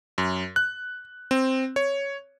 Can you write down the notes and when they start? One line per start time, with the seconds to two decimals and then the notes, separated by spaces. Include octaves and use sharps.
0.18 F#2
0.56 F#6
1.31 C4
1.76 C#5